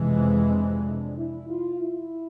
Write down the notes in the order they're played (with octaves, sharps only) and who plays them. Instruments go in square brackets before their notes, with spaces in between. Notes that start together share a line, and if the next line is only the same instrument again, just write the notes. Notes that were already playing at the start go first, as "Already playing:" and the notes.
Already playing: [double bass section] F2 C3 E3 G#3
[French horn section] C4
D4
E4
F4
E4